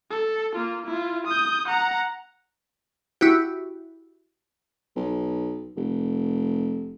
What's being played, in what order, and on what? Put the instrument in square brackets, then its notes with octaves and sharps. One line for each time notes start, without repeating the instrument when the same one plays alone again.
[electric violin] A4
A#3 F4
E4 F4
D#6 G6
F#5 A#5
[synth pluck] E4 F#4 G4
[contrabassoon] B1
F1